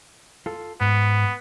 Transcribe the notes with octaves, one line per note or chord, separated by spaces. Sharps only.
F4 A4
G#2 B3